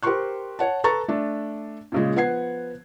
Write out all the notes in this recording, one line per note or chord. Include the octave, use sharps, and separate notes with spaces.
G4 A#4 C5 C6 C#6 F#6
C#5 F#5 A5
A4 B4 A#5 C#6 A6
A3 D4
A#2 C#3 G#3
F3 B3 F#5 G#6 C7